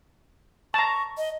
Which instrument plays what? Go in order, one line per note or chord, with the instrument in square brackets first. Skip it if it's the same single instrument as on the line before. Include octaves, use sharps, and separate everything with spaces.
[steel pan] A5 A#5 [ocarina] C#6
[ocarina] D#5